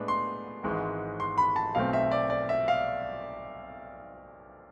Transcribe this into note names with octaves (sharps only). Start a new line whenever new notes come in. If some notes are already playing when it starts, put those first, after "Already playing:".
Already playing: A2 G#3 B3 D4
C6
G#1 G#2 E3 G#3
C6
B5
A5
B1 B2 A3 C4 F5
E5
D5
D5
E5
F5